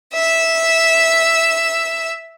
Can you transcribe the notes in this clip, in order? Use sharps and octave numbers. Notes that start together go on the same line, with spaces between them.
E5 E6